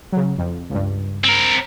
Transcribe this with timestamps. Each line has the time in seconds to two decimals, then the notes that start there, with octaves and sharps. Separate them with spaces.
0.12 C#3 F#3
0.38 F2
0.70 C#2 G2
1.24 C4 A#4